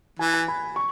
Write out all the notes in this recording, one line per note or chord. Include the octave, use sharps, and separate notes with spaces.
E3 G#5
G#5
B5
C#6